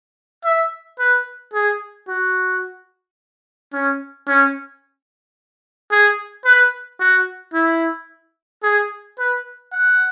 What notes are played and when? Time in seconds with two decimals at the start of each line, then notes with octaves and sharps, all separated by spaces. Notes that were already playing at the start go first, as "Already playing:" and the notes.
0.45 E5
0.99 B4
1.54 G#4
2.08 F#4
3.73 C#4
4.28 C#4
5.91 G#4
6.45 B4
7.00 F#4
7.54 E4
8.63 G#4
9.19 B4
9.72 F#5